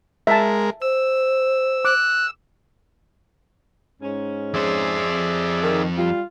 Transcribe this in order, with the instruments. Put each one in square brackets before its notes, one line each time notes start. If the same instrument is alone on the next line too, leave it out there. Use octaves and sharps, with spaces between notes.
[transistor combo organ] G#3 A#4 [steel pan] E5 A5
[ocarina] C5 [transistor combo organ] E6
[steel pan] D6 [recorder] F#6
[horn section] G#2 C#4
[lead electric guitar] F2 C5 [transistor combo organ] G#4 D5 E5
[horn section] D#3
G3 F4